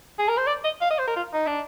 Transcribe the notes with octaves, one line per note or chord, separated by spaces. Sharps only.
G#4
A#4
C5
D5
D#5
F5
D#5
C5
A#4
F4
D#4
D4